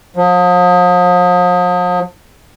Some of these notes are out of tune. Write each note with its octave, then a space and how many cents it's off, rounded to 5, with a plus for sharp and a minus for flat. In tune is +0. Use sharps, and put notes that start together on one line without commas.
F3 +40